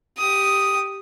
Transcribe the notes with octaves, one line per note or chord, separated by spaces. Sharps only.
G4 D#6